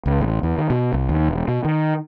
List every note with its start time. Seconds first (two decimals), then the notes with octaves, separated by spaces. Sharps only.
0.06 C#2
0.21 A1
0.43 E2
0.58 D#3
0.70 B2
0.93 C2
1.09 D#2
1.28 E1
1.48 B2
1.64 D#3